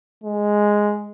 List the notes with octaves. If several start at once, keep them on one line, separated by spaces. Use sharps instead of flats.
G#3